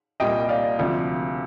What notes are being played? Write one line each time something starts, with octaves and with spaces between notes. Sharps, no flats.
C2 A#2 G3 D#5 G5
D5 F5
D2 C3 F3